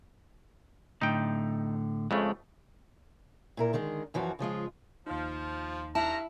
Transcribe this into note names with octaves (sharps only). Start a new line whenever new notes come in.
A2 D3 D#4 G5
F2 C#3 G#3 A3
A#2 E4 A#4
D3 D#3 G#3 G#4
F#2 E3 F3 F#4
C#3 F3 G#3 F4
D#2 F3 D#4
G2 E4 A5 A#5